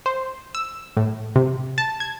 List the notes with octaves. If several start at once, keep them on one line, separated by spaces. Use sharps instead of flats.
C5
E6
A2
C3
A5
G#6